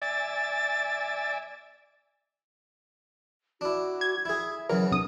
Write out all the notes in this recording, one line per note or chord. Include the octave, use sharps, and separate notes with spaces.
D5 E5 G#5 A6
D4 E4 F#4
G#6
E4 G#4 E5
C#3 E3 F#3 A#4
C2 D4 D#6